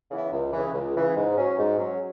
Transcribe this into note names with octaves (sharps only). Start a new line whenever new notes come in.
C#3 E3 B3 E4
C#2
C#3 E3
C#2
C#3 E3
G#2
F#3 C#4
G#2
F#3 C#4